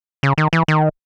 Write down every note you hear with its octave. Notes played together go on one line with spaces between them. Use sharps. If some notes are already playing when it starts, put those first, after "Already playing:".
C#3
D#3
E3
D#3